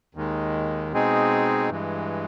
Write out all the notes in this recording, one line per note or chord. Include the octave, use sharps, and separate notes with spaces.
D#2 D#3 G#3
B2 G#3 C4 D#4 G#4
G2 E3 G#3